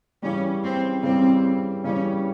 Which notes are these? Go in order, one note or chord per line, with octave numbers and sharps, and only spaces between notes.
C#3 E3 G3 C#4
C4
C#3 E3 G3 C4
C#3 E3 G3 C#4